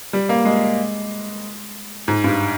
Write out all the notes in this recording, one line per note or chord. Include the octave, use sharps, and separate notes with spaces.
G3
A#3
G#3
G#2
G2